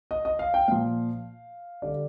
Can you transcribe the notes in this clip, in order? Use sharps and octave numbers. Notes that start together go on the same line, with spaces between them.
D#5
D#5
F5
G5
A#2 F3 F5
D3 G3 D5